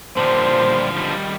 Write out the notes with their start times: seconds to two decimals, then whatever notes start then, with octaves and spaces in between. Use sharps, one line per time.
0.17 A#2 D3 F3 G3 C5
0.96 D#3 G3